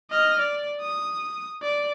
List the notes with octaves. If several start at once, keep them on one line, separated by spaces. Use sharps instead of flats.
D#5 F6
D5
D#6
D5